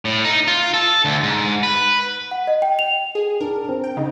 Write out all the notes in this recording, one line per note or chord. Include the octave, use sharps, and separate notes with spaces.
A2
D#4
F4
A4
D2
G#2
B4
F#5
D#5
G5
F7
G#4
D4 A#4
C4
G5
C#3 D#4 D#5